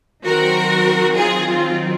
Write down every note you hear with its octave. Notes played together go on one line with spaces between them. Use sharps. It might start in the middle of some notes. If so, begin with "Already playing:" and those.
D#3 F#3 C4 F#4 A#4
F4 G#4
F4